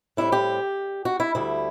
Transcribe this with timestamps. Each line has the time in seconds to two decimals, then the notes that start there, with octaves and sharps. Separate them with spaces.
0.17 A2 G3 C4 E4
0.32 G4
1.05 F#4
1.20 E4
1.35 D2 D3 G3 E4